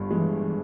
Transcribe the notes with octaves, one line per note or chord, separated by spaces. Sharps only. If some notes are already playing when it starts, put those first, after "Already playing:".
Already playing: G1 G2
E3 G#3